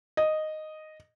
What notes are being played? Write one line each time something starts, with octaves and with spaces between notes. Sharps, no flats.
D#5